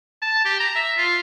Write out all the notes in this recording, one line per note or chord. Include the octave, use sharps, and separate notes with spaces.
A5
G4
A#5
E5
F4